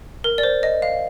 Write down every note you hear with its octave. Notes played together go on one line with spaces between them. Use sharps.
A#4
D5
C5
D#5
F5